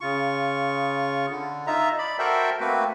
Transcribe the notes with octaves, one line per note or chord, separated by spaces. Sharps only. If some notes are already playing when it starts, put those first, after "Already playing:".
C#3 F4 C#6
D3
D#4 F4 E5 A#5
D5 B5
F#4 A4 A#4 C5 E5 G5
A3 A#3 C4 F#4 B4